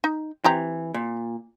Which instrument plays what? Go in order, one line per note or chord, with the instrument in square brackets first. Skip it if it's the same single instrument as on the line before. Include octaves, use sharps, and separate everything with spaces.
[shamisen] D#4
[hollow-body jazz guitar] E3 [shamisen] C4 G4 A#5
[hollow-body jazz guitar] A#2